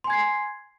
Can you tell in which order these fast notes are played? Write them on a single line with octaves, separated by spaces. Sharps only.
C6 G#5 G#6 C7